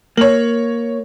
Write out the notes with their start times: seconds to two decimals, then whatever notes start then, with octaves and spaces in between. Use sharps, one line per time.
0.17 A#3 C#5 F#7